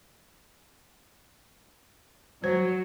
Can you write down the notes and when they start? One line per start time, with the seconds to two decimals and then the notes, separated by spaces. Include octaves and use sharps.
2.44 F#3 C5